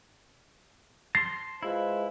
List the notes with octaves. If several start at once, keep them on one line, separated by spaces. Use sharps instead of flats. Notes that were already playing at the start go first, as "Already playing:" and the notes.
A5 C6 A6 A#6 C7
G#3 E4 F4 B4 C5